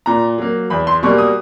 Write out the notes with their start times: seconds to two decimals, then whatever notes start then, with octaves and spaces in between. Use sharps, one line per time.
0.06 A#2 A#5
0.38 F#3 A#3
0.70 E2 B5
0.87 C6
1.03 B2 G3 A#3 C#6
1.18 D#6